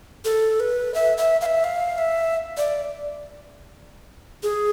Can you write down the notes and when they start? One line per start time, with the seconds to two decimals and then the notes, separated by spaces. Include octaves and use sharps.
0.25 A4
0.60 B4
0.94 E5
1.18 E5
1.41 F5
1.46 E5
1.64 F5
1.98 E5
2.57 D5
4.43 G#4